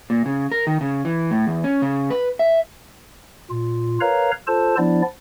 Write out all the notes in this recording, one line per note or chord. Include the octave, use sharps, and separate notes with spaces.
A#2
C#3
A#4
D#3
C#3
E3
A2
E2
C#4
C#3
B4
E5
A#2 F4
A#4 B4 C#5 F5 A#5
F4 A4 C5 A5
F3 B3 D4 E4 D5